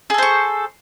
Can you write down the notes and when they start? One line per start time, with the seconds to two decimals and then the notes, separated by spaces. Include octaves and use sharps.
0.10 G#4
0.14 A4
0.18 C5
0.22 C#6